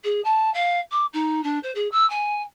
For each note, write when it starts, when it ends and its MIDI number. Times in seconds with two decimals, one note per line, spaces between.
0.04 0.21 68
0.24 0.52 81
0.54 0.79 77
0.91 1.05 86
1.13 1.43 63
1.43 1.58 62
1.63 1.71 72
1.75 1.88 68
1.91 2.08 88
2.09 2.42 80